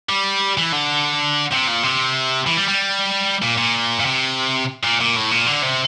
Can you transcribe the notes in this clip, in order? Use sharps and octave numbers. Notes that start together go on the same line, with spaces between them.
G3
E3
D3
C3
A#2
C3
E3
G3
G3
A#2
A#2
A#2
C3
A#2
A#2
A2
A#2
D3
C3